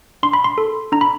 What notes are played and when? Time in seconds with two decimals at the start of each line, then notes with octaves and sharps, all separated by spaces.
0.23 D4 C6
0.33 B5
0.44 C6
0.58 A4
0.92 D4 A#5
1.01 B5